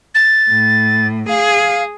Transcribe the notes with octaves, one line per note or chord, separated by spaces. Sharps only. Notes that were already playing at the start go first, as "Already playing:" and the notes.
A6
A2
G#4 F5